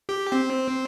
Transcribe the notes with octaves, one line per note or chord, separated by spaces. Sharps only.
G4
C4